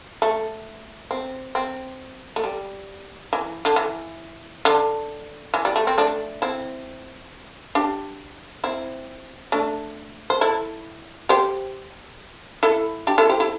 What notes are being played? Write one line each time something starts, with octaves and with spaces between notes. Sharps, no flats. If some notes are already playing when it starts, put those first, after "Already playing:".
A3
C4
C4
A3
G3
E3
D3
E3
D3
E3
G3
A3
C4
A3 D4
C4 E4
D4 G4
C4 E4
A3 D4
C5
E4 A4
G4 C5
E4 A4
D4 G4
E4 A4
G4 C5
E4 A4